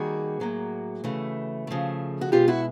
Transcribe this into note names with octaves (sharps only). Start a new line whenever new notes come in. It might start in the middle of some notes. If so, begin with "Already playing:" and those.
Already playing: D#3 G3 A#3 F#4 G#4
A2 F#3 A#3
C#3 E3 A3
C#3 F3 A3
F#4
B2 G#3 F4 G4
E4 F#4